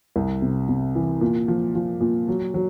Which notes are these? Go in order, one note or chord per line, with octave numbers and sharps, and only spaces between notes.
C2
C3
C3
E3
A#2
F3
F3
A#2
F#3
F#3